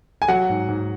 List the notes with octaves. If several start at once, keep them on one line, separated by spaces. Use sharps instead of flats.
G#5
F#3 F#5
G#2
G#2